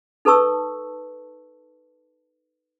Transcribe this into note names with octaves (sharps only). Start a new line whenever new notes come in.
D#4 A4 B4 A5 C#6 E6